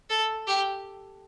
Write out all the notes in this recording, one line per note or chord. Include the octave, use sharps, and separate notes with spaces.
A4
G4